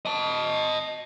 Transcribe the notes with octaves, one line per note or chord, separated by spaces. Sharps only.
D#5 A5